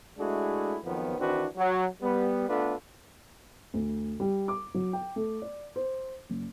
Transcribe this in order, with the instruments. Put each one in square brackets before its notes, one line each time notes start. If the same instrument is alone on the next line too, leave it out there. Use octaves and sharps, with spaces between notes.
[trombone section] G#3 A3 D4 E4 F#4 G#4
F2 D#3 F3 F#3 B3
D#3 E3 C4 D4 F#4 B4
F#3
G3 B3
A3 B3 D4 F4 A4 B4
[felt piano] D2
G3
D6
F#3
G5
A3
D5
C5
F#1